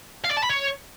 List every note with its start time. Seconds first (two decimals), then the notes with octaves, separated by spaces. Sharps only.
0.24 F5
0.31 D5
0.37 A5
0.43 B5
0.49 C#5